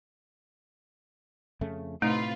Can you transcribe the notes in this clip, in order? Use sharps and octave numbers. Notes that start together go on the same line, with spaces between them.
F2 C#3 A3
A2 C3 A3 D#4 F4 B4